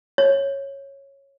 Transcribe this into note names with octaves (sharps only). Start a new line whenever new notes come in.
C#5